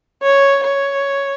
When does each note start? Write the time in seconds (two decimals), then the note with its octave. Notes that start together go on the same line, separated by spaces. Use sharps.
0.22 C#5
0.64 C#5